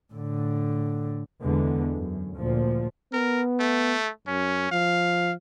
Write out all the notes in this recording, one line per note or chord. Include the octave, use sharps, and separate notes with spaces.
A2 D3
E2 D3 G#3 B3
F#2
D2 A#2 F3
B3 A#4
A3
F#2 C#4
F3 F5